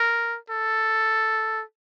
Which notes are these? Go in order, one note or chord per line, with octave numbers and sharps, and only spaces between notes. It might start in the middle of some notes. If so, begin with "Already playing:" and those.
Already playing: A#4
A4